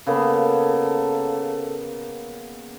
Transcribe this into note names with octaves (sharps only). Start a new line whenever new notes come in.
C#3 A#3 B3 A4